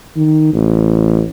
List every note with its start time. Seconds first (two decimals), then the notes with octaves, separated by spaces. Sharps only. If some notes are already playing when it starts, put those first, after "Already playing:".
0.17 D#3
0.53 A1